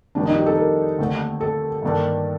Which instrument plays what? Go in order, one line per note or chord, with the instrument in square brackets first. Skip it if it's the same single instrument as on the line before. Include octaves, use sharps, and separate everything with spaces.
[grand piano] F2 D#3 G3 A#3 [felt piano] D4
[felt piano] D#4
G4
A4
A#4
[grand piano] D#2 D3 A3 C4
[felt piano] A4
[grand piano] G2 D#3 A#3 D4 A4